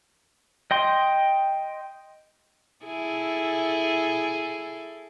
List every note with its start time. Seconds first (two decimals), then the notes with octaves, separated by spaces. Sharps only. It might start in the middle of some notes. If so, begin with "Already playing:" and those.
0.71 D#5 G5 C6
2.85 E4 G#4 A4